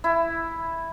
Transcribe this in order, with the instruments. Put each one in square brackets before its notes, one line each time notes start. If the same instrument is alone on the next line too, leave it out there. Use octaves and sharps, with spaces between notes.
[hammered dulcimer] E4